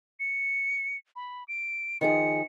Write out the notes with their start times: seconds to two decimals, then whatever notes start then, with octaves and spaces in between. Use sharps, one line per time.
0.20 C#7
1.16 B5
1.48 D7
2.01 D#3 F3 G#4 C#7